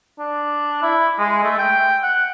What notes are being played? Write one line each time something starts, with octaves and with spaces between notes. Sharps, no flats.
D4
E4
G#3
A3
G5
F#5